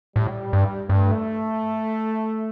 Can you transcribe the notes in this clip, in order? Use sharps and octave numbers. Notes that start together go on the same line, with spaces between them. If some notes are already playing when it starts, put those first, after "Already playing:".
A2 G3
G2
G2 A3